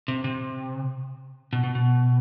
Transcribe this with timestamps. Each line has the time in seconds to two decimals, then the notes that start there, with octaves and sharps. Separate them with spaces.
0.08 C3
0.24 C3
1.53 B2
1.64 B2
1.75 B2